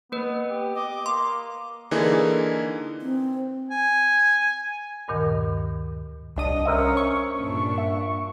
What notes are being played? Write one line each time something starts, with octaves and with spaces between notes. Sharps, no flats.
A#3 B3 B4
G4
D#5 D6
A#3 C6
D3 E3 A#3 D#4 G#4
C4
G#5
D2 G2 A#2 D#3
C2 D4 D#5 D#6
C#4 A#4 C5 C#5 E5
C#6
G2 A#2 D4
E5